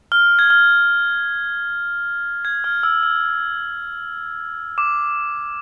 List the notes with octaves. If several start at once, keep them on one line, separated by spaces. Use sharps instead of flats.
F6
G#6
F6
G#6
F6
E6
F6
D6